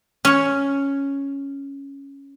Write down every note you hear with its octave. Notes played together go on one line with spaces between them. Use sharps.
C#4 C#5